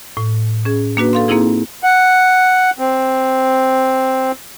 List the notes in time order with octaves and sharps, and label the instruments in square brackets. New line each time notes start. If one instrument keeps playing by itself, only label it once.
[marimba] A2
C#4 G#4
A#3 D4 F#4 B4
A4 F5 C6
A#3 C4 D#4 E4 G#4
[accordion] F#5
C4